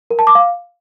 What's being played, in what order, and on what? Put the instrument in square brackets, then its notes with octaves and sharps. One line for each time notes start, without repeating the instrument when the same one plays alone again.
[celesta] A#4
A5
D6
F5